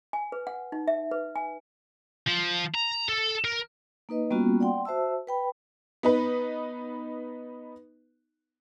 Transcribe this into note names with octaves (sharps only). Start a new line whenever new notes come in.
G#5
B4
F#5
D#4
E5
B4
G#5
F3
A#5
A4
A#4
A#3 D#4 B4 D#5
G3 A#3 B3 C#4 F4 F#4
D5 F#5 G5 C6
F#4 C5 E5 A5 E6
B4 G5 B5
B3 D#4 B4